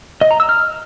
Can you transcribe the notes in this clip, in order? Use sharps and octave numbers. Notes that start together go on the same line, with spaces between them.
D#5
A#5
E6
F6